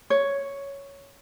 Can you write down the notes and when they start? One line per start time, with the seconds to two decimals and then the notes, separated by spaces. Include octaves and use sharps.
0.10 C#5